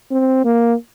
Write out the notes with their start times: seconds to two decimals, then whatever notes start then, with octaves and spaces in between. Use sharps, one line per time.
0.11 C4
0.45 A#3